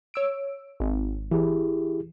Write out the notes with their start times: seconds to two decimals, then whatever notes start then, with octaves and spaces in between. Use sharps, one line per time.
0.14 C#5 E6 D7
0.80 G#1
1.31 E3 E4 G4 G#4